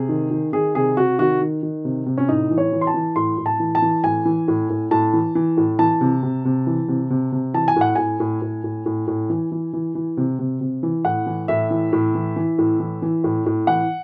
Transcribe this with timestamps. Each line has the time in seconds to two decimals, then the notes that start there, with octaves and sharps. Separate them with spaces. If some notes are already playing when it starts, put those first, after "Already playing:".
Already playing: C3 G#4
0.09 D#3
0.31 D#3
0.53 D#3 G#4
0.75 C3 G#4
0.97 C3 F#4
1.19 D#3 F#4
1.41 D#3
1.63 D#3
1.85 C3
2.06 C3
2.18 C#4
2.28 A2 D#4
2.51 E3
2.58 C#5
2.72 E3
2.81 C6
2.87 A5
2.94 E3
3.16 A2 C6
3.38 A2
3.46 A5
3.60 E3
3.75 A5
3.82 E3
4.04 A2 G#5
4.25 E3
4.48 A2
4.70 A2
4.91 A2 A5
5.13 E3
5.35 E3
5.57 A2
5.79 E3 A5
6.01 C3
6.23 C3
6.45 C3
6.67 E3
6.88 C3
7.10 C3
7.32 C3
7.54 E3 A5
7.68 G#5
7.76 A2 F#5
7.95 A2 G#5
8.20 A2
8.42 A2
8.64 A2
8.86 A2
9.07 A2
9.30 E3
9.52 E3
9.73 E3
9.95 E3
10.17 C3
10.39 C3
10.61 C3
10.83 E3
11.05 A2 F#5
11.26 E3
11.48 A2 E5
11.71 E3
11.92 A2
12.15 E3
12.36 E3
12.58 A2
12.80 E3
13.02 E3
13.24 A2
13.46 A2
13.67 E3 F#5